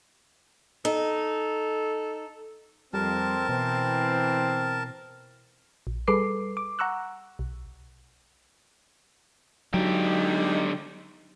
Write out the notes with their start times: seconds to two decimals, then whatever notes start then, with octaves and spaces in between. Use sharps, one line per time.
0.85 D#4 A4
2.94 F2 G3 C4 A#4 A5
3.49 B2 E3 C4
5.87 A#1
6.08 G3 G#4 A4 B4 D6 C7
6.57 D6
6.79 F#5 A#5 C#6 E6 F#6
7.39 B1
9.74 D3 F#3 G#3 D4 D#4 G4